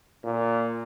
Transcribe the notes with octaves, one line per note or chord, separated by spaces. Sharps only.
A#2